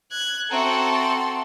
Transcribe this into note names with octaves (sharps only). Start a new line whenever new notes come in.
F#6 G#6
C4 F#4 A4 E5 A#5 C6